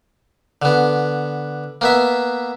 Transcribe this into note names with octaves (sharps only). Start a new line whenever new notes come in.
D3 B3
A#3 B3 E5